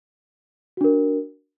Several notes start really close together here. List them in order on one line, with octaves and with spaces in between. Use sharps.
F#4 D4 A#4